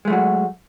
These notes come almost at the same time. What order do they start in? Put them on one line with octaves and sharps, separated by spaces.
G#3 A3 F#3 F#4